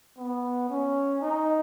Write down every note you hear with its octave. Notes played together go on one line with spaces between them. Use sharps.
B3
C#4
D#4